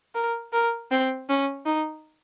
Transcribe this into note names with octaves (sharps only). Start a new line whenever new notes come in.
A#4
A#4
C4
C#4
D#4